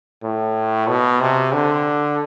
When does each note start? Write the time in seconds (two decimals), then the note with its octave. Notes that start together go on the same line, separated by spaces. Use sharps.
0.23 A2
0.89 B2
1.21 C3
1.53 D3